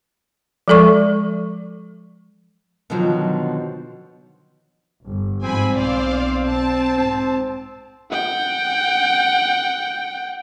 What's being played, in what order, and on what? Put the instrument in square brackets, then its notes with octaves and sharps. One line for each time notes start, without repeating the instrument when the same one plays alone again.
[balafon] F3 G#3 A4 D5 C#6
[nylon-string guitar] B2 D3 D#3 F3 F#3
[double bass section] G1
[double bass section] G#2 F3 [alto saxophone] C4 [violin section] G#5 B5
[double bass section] B1 [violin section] C5 D5 F5
[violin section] A5
[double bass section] G#2 [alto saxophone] C4
[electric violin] F#5 G5